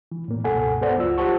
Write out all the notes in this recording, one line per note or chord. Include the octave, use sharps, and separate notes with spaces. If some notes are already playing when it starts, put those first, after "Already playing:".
E3
A2 A#3
C#2 G2 B2 A4 F#5 G#5
B3 A4 B4 C5 D5 F#5
C#2 F#3 F4 E6
F4 G4 C5 F#5 A5 C#6